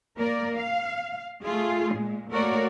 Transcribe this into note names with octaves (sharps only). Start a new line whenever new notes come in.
A#3 A#4 D5
F5
A3 F4 G#4
A#2 G#3
A3 A#3 F#4 A#4 C#5 D5